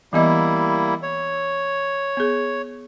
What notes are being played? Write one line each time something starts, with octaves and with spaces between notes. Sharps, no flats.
E3 G3 A#3 B3 E4 D#5
C#5
B3 G#4